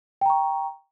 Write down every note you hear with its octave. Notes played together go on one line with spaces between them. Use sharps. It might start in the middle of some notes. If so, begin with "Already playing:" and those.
G5 A#5 C#6